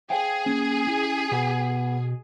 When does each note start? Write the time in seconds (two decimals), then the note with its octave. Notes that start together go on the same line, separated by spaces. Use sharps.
0.10 G#4 C5 F5 G5
0.46 A#3 C#4
0.87 C#4 E4
1.31 B2 B3